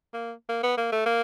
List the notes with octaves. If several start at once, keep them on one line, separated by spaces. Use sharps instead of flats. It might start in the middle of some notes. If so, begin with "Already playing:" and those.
A#3
A#3
B3
A#3
A3
A#3